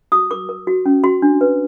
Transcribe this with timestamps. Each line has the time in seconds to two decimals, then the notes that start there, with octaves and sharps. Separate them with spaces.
0.12 F#4 D#6
0.31 A#4 D6
0.49 A#4
0.67 F#4
0.86 C#4
1.04 F#4 C6
1.22 D4
1.41 B4